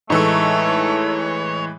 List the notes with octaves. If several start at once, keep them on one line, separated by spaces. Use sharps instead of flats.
A2 E3 G#3 A3 D#4 A4 C#5